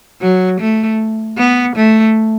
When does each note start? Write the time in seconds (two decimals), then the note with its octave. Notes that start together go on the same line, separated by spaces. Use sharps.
0.22 F#3
0.60 A3
1.38 B3
1.76 A3